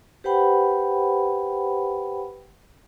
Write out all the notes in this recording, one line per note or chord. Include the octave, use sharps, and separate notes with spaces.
G4 B4 C5 F#5 G5 B5